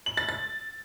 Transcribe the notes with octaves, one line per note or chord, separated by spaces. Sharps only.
F#7
A6
A6